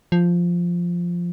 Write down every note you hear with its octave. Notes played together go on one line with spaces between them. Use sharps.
F3